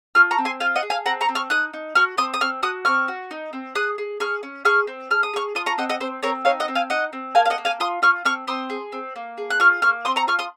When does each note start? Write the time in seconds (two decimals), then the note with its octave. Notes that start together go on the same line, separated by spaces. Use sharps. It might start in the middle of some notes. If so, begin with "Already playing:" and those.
0.15 F4 C#6 F6
0.31 A#5 C#6
0.38 C4
0.45 G#5 C6
0.60 F4 F5 G#5
0.76 D#5 F#5
0.83 G#4
0.90 F5 G#5
1.06 C4 F#5 A#5
1.21 A#5 C#6
1.29 C4
1.35 C#6 F6
1.50 D#4 D#6 F#6
1.73 D#4
1.95 F#4 C#6 F6
2.18 C4 C6 D#6
2.34 D#6
2.41 C4 C#6 F6
2.63 F#4 D#6 F#6
2.85 C4 C#6 F6
3.08 F#4
3.31 D#4
3.53 C4
3.75 G#4 D#6 F#6
3.98 G#4
4.20 G#4 C#6 F6
4.43 C#4
4.65 G#4 C#6 F6
4.87 C4
5.11 G#4 F6
5.23 D#6
5.34 G#4 C#6 F6
5.55 F4 C6 D#6
5.66 A#5 C#6
5.78 C4 D#5 F#5
5.89 D#5 F#5
6.00 C4 C5
6.23 C4 A#4 C#5
6.45 D#4 C#5 F5
6.60 D#5 F#5
6.68 C4
6.75 F5 G#5
6.90 D#4 D#5 F#5
7.13 C4
7.35 A#3 F5 G#5
7.46 F5
7.50 D#5 F#5
7.58 A#3
7.65 F5 G#5
7.80 F4 C6 D#6
8.02 F4 C#6 F6
8.25 C4 C#6 F6
8.47 C4 C6 D#6
8.70 G#4
8.92 C4
9.16 A#3
9.38 G#4
9.50 F#6
9.60 F4 C#6 F6
9.82 A#3 C#6 F6
10.05 C4 C6 D#6
10.16 A#5 C#6
10.27 F4 C#6 F6
10.39 C6 D#6